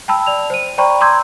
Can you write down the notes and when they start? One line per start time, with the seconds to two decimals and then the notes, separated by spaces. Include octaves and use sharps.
0.08 G5 A5 B5 E6
0.26 D5 F7
0.50 C5 D#7
0.78 C5 D5 G5 A#5 B5 C#6
1.01 A#5 C6 D6 E6 G6 G#6